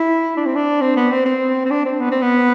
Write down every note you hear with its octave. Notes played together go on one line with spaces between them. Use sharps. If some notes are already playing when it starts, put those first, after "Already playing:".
Already playing: E4
D4
C4
D4
C4
B3
C4
C4
C4
D4
C4
B3
C4
B3